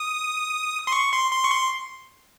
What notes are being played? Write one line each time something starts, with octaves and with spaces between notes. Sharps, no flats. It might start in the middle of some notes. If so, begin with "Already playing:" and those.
Already playing: D#6
C6
C#6
C6
C6
C#6
C6